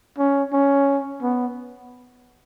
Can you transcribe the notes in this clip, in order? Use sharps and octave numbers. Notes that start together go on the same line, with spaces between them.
C#4
C#4
B3